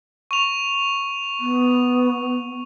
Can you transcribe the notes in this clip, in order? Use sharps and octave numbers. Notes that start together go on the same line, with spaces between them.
C#6 F7
B3